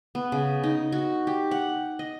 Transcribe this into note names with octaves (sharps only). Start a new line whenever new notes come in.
B3
C#3
D#4
F#4
G4
F#5
D#5